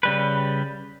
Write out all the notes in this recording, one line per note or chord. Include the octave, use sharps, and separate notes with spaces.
C#3 G3 B4